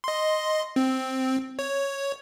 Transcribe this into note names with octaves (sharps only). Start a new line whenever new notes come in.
D#5 C6
C4
C#5